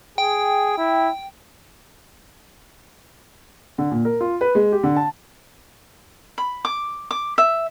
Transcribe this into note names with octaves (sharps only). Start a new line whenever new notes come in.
G#4 G5
E4
D3
A#2
A#4
F4
B4
G#3
G4
D3
A5
B5
D6
D6
E5